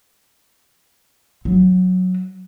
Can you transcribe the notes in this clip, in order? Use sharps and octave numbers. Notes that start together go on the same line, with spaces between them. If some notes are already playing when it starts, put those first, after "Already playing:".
F#3